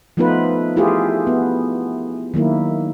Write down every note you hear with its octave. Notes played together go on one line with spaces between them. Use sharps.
F3 A3 B3 D#4 F4 B4
A3 E4 F4 G4 G#4
B3
D#3 F#3 A#3 E4